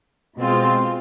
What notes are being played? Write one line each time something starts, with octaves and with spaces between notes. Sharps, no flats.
B2 G#3 C4 F4